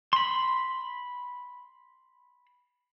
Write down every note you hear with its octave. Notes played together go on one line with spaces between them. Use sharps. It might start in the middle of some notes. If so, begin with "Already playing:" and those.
B5 C6